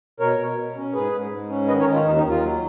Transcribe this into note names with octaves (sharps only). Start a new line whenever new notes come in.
B2 A#4 C#5
B2
B2
C#4
G#2 G#4 B4
G#2
G#2
C#4
D#3 B4 D#5
A#4 C#5
D#3
F4
D#2 D#4
D#4
D#2
F4
F#3